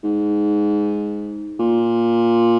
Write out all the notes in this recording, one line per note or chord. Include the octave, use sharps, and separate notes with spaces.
G#2
A#2